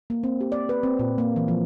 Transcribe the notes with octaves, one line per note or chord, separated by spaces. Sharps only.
A#3
C4
G4
D5
B4
C4
A#2
A#3
E3
F3